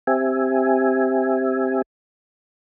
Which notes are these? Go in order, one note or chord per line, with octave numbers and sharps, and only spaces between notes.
C4 G4 E5 G#5